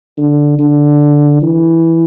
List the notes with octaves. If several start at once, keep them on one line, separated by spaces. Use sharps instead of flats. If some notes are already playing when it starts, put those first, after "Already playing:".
D3
D3
E3